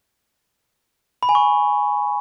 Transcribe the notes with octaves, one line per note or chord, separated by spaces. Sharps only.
B5
G#5
C#6